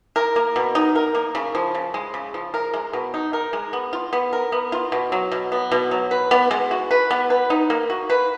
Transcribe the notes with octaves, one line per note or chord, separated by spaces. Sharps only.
A#4
A#3
B2
D#4
A#4
A#3
C#3
F3
C#3
G#3
C#3
F3
A#4
G#3
B2
D#4
A#4
G#3
B3
F4
B3
A#4
B3
F4
B2
F#3
B2
B3
B2
F#3
B4
B3
G#3
F#4
B4
B3
B4
D#4
A#3
F#4
B4